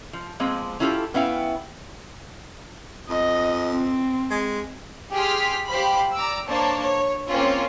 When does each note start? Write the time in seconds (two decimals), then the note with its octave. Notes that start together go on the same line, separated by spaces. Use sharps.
0.13 F3
0.40 F3 G#3 A#3 C4
0.80 C#4 E4 F4 G4 A4
1.14 B3 C#4 E4 E5 F5 G5
3.09 F2 D#5
3.71 C4
4.30 G#3
5.12 G4 G#4 C6 F6 B6
5.67 G4 C5 F5 B5
6.14 D5 A#5 D6 E6
6.48 A#3 D4 C5 C#5 A5
6.82 C#5
7.28 A#3 C4 C#4 F4